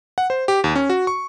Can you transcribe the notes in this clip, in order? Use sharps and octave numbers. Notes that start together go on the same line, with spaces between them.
F#5
C5
G4
D#2
C#4
F#4
C#6